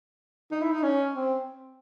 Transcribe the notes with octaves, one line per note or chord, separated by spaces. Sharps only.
D#4
E4
D#4
C#4
C4